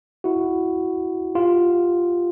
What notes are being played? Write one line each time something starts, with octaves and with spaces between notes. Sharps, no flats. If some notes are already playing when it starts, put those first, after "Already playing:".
E4 F#4
F4 G4